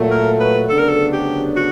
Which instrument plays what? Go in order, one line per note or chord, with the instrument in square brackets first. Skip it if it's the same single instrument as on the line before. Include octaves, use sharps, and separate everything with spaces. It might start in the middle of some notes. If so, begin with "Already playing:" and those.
Already playing: [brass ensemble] A#2 F#3 A3
[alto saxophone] A#4
B4
[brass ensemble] D2 C#3 F#3 B3 D4 [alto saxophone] A4
[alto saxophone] A#4
A4
G4
F#4